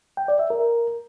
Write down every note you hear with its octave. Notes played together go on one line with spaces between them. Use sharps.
G5
D5
E5
A#4